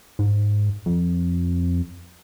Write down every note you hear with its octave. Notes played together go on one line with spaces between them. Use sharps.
G#2
F2